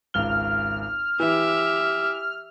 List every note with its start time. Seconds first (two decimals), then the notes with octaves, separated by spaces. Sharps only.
0.14 G#1 C#2 F6 G7
1.20 E3 G4 E5